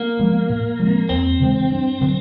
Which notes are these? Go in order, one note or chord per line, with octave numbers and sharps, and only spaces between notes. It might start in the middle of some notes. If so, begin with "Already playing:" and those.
Already playing: A#3
F3 G#3 B3
A2
F3 G#3 C4
E2 C4
C#3 E3 G#3
G2
D3 F#3